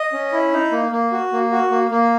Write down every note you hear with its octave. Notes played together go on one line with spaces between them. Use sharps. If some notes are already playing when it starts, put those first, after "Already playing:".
Already playing: D#5
C#4
E4
D#4
A#3
A#3
F#4
A#3
F#4
A#3
A#3